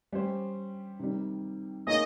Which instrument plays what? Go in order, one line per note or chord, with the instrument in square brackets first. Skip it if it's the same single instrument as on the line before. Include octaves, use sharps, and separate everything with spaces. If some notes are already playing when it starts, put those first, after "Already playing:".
[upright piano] G3 C#4 G4 C5
C3 D#3 G3
[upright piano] A#3 D#4 G#4 C#5 [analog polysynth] D#5